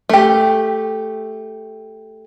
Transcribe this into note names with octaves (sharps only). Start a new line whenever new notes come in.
A3 G4